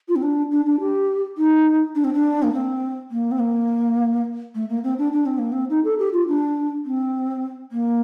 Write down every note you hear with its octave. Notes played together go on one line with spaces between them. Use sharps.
F4
C4
D4
D4
D4
G4
D#4
D4
C4
D4
A#3
C4
A#3
C4
A#3
A3
A#3
C4
D4
D4
C4
A#3
C4
D#4
A4
G4
F4
D4
C4
A#3